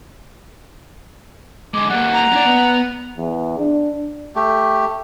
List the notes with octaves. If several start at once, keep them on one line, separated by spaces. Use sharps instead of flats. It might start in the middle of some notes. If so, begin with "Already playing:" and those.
D3 G#3 D6
G3 A#3 F#5
A#5
C#4 D5
B3
E2
D4
A3 G4